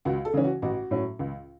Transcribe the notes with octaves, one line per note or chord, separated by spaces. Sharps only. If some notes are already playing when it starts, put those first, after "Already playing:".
C#2 F#4
A4
C#3 E3 C#4
F#4
A1 F#4
A2 F#3 C#4
C#2